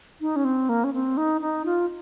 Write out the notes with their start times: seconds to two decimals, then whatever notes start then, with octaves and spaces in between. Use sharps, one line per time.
0.21 D#4
0.36 C#4
0.45 C4
0.69 A#3
0.84 C#4
0.94 C4
1.17 D#4
1.41 D#4
1.65 F4